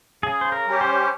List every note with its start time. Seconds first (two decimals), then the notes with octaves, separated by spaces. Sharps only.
0.23 C#3 G#4
0.41 C5
0.52 A#4
0.67 G3 C#4 G4
0.81 C5